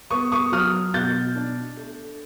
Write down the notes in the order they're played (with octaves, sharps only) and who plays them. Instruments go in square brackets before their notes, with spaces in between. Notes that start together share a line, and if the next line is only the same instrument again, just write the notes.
[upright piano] B3 C#6 D#6
C#6 D#6
F#3 D#6 F6
B2 G6 A6
D4
A3